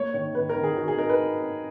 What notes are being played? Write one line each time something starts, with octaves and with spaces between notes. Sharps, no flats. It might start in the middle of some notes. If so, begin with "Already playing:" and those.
Already playing: A#3 C#5
D#3 C#5
D#3 B4
A#4
D#3
G#4
D#3 F#4
G#4
D#4 A#4
B4